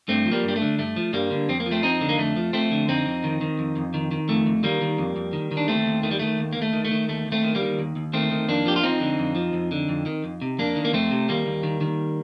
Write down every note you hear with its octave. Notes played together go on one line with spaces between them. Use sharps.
G2 A3 C4
F3
G3 A#3
G2
G3
A3
D3
G2 A3
F3
G2 G3 A#3
D3
F2 C4
A#3
F3
A3 C4
F2 C4 D#4
D3
A#3
F2 A3
F3
F2 A3 C4
D3
F2 C4 D#4
F2
D#3
D#3
F2
F2
D#3
D#3
F2 A3
F2
D#3 G3 A#3
D#3
F2
F2
D#3
D#3
D4
D#2 A3 C4
D#2
D#3 A3
G3
D#3 A3
D#2
D#2 A#3
A3
D#3
A3
D#3
D#2 A3
D#2
A3 C4
D#3
G3 A#3
D#3
D#2
D#2
D#3 A3 C4
D#3
F2 A#3 D4
F3 G4
F4
F2 C4 D#4
D3
F2
F3
F2
D3
F2
D#3
F2
C3
F2 A#3 D4
D#3
A#3
F2 A3 C4
C3
D#2 G3 A#3
D#2
D#3
D#3